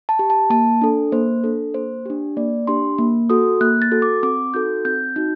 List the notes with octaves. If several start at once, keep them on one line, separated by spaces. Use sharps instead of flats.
A5
G4
A5
A#3 A5
D4 A4
A#3 C5
D4 A4
A#3 C5
D4 G4
A#3 D5
D4 G4 C6
A#3
F#4 A4 D#6
A#3 F#6
A6
F#4 A4
D6
C4 D6
D#4 F#4 A4 G6
C4 G6
D#4 F#4 G6